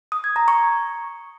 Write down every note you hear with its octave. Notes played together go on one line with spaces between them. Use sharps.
D#6
G#6
A#5
C#6